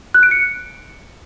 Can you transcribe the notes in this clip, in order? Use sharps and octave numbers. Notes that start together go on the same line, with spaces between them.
F#6
D7
C#7